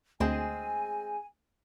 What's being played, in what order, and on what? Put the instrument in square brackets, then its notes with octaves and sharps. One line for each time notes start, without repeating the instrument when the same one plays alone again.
[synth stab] D2 [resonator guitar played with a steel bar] G#3 C4 G#4 [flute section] G#5